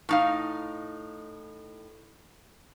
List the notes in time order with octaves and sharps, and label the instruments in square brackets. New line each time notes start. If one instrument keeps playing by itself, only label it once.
[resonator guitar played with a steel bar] A2 D#4 F5